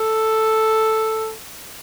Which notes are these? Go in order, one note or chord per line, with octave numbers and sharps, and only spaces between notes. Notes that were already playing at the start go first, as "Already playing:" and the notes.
Already playing: A4